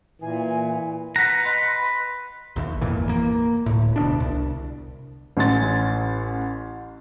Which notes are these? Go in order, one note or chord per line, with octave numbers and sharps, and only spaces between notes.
A#2 E3 G#5
B4 F#5 A#5 F#6 B6
D#5 B5 C6
A#1 D#2
G#1 F2 A#2 E3
A#3
D1 A2
E1 D2 B2 D4
C2
A1 C#4 C6 A6